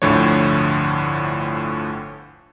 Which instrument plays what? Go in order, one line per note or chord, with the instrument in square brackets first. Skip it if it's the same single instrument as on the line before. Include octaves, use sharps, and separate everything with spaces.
[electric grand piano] G1 D2 A2 D3 F3 C#5